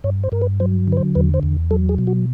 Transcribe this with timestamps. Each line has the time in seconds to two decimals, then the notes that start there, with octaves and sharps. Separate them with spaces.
0.04 G2 C#5
0.24 C5
0.32 G2 A#4
0.42 B4
0.60 F#3 C5
0.88 D3 B4
0.97 C5
1.15 E2 B4
1.34 C5
1.43 E2
1.71 F#3 A4
1.89 G#4
1.98 B2
2.07 F#4